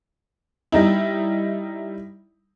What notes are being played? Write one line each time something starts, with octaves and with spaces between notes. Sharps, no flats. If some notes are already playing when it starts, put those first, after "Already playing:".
G3 D#4 E4